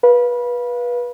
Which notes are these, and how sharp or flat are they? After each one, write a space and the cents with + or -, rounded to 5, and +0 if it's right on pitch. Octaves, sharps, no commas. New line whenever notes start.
B4 -25 F5 +0